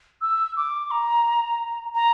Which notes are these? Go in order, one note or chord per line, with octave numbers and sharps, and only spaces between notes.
E6
D6
A#5
A#5